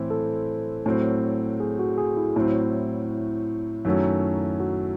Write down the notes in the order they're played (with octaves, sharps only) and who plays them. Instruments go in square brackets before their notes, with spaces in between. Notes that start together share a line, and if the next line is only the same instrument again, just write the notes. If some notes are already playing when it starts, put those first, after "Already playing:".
Already playing: [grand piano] A2 E3 C4 E4 [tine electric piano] C5
[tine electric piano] A4
[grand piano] A2 F#3 C4
[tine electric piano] G#4
F#4
G#4
E4
[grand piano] A2 F#3 C4 [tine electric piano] E4
[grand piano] F#2 D#3 F#3 A3 C#4
[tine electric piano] F#4